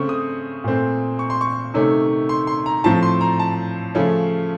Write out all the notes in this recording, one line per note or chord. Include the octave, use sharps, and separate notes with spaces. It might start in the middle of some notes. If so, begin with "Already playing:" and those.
Already playing: C#3 A3 C4 C#6
D#6
A#2 A3 C4
C#6
C6
C#6
C3 D#3 A3 C#4
C6
C6
A#5
A2 F3 C4 A5
C6
A#5
A5
C#3 F3 A3 C#4